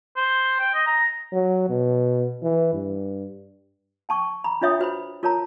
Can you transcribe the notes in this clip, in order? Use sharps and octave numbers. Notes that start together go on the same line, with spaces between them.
C5
G5
D#5
A#5
F#3
B2
E3
G2
G5 A5 C#6
A#5 B5
D4 F4 C#5 E5 G5 D#6
F#4 B4 C5 B5
F4 A#4 C#5 A5 A#5